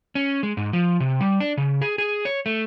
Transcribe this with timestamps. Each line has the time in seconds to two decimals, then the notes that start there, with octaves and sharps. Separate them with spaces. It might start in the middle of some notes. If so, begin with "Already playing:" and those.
0.15 C#4
0.43 G#3
0.57 G#2
0.73 F3
1.00 C3
1.21 G3
1.40 D4
1.57 C#3
1.81 G#4
1.98 G#4
2.25 C#5
2.46 A3